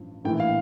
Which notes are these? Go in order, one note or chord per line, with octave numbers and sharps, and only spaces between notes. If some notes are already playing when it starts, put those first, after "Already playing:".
Already playing: A1 G2 F3
A#1 A2 E3 G5
F5